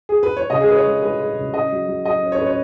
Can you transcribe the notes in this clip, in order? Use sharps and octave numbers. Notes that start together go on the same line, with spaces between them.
G#4
B4
C#5
C#3 D#5
G#4
G#3 B4
C#5
G#3
G#3 B4
G#3
C#3
C#4 D#5
F#3
F#3
F#3 D#5
C#4
C#5
B4
C#4
C#5